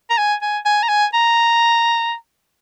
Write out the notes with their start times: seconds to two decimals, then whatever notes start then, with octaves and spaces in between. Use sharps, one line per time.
0.10 A#5
0.18 G#5
0.42 G#5
0.65 G#5
0.83 A#5
0.89 G#5
1.14 A#5